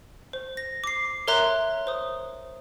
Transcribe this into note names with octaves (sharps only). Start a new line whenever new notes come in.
C5
A#6
D6 C7
A#4 C#5 E5 A#5 C6 F#6
C5 D#6